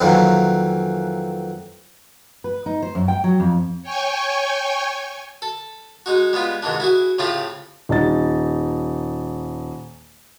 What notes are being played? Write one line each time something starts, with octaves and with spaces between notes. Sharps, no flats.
F2 D#3 E3 F#3 A#3
B4
D#4
C5
F#2
G5
F#3
F2
C#5 G5 G#5 C#6
A4
G#3 D#4 F#4
G3 G#3 B3 F4
G#2 C3 D#3 E3 D4
E4 F#4 G#4
A2 C#3 A3 C4 F4 G4
D#1 D#4 A6